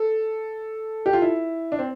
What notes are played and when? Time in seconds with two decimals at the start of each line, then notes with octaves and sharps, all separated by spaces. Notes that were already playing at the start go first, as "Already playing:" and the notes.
Already playing: A4
1.06 G4
1.13 F4
1.22 E4
1.72 D4
1.79 C4